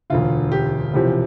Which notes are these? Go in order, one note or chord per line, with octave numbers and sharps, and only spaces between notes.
E1 D2 D3 F4
G4
E1 E2 C3 F3 G4